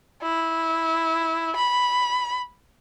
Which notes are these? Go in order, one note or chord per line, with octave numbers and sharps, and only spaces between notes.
E4
B5